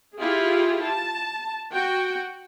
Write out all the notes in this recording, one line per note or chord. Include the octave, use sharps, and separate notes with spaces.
E4 F4 G4 G#4
A5
F#4 G5